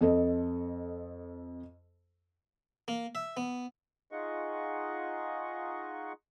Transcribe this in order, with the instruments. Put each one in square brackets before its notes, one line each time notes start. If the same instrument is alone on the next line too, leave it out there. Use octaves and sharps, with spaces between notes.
[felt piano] F2 A4 D#5
[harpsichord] A#3
E5
B3
[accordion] D#4 F4 G#4 D#5 F#5 C#6